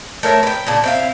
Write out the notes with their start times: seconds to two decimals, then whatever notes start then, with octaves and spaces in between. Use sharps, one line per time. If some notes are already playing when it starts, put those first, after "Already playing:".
0.23 A3 A#4 C#5 E5
0.43 B4 G5
0.67 A#2 C#3 D4
0.84 C4 E4 F5